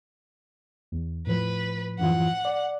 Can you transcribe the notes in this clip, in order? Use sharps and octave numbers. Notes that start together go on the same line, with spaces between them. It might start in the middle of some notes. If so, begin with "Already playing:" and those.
E2
A2 F3 B4
F#2 E3 F4 F#5
D5